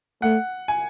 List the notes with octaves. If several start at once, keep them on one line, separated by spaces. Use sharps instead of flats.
A3 F#5
G#5